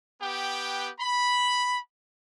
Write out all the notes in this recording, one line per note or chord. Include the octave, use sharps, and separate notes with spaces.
B3 G4 B4 G5
B5